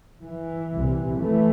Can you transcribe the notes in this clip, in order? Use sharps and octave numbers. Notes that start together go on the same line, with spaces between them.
E3
C2 C3
E3 A3